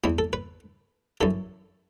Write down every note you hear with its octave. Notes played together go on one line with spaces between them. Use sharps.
E2 E3 E4
A4
B4
F#2 E3 A4